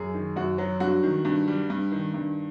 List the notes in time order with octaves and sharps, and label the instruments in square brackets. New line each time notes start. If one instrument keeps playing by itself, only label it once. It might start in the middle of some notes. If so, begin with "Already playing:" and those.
Already playing: [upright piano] F#2 G#4
D#3
F#2 F#4
F#3
G2 F#4
D#3
G2
G3
G2
D#3
G2